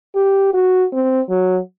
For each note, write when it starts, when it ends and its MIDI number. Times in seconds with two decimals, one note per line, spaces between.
0.16 0.50 67
0.54 0.84 66
0.93 1.21 60
1.30 1.58 54